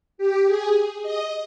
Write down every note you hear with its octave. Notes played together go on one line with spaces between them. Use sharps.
G4
G#4
D#5